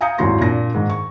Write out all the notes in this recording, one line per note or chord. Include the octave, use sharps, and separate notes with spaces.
F5 G#5 A#5 D#6 G6 C#7
G#1 D#2 E4 F#4 C6 A#6
A#2 D4 A#6
G#2 D#3
C#6